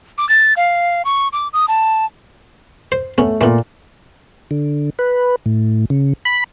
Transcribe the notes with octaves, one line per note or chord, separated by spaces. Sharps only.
D6
A6
F5
C#6
D6
D#6
A5
C5
A3 B3 C#4
A#2 A3 B3
D3
B4
A2
C#3
B5